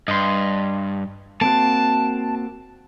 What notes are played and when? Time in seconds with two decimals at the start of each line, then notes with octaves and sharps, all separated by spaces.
0.08 G2 D#5 C6
1.41 A#3 C4 F#4 A5